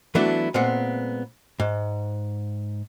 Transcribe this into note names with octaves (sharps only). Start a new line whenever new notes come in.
E3 F#3 A3 B3 D4 E4
A#2 G#3 B3 C4 F#5
G#2